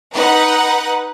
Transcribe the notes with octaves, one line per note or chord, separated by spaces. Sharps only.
D#4 B4 F#5